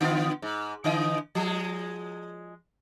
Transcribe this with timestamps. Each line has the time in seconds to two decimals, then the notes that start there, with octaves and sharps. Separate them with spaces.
0.01 D3 B3 F4
0.42 G#2
0.84 D3 E3 D#5
1.35 F3 G#3